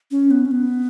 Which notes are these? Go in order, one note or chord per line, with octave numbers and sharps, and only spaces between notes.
C#4
B3
C#4
B3